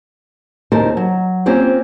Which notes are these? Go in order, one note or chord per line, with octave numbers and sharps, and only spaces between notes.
D#2 C#3 D#4 A#4 C5 A5
F#3
A#3 C4 C#4 F4 C5